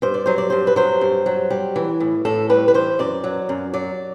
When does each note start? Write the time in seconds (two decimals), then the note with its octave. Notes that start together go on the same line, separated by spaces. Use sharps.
0.02 G2 C5
0.14 D5
0.26 F#3 C5
0.38 D5
0.50 G2 C5
0.67 B4
0.76 F#3 C5
1.01 G2
1.26 F#3
1.50 G3
1.76 E3
2.00 A2
2.25 A2 A4
2.49 G3 B4
2.68 B4
2.74 E3 C5
2.99 F#2 D5
3.24 F#3
3.49 F#2
3.73 F#3 D5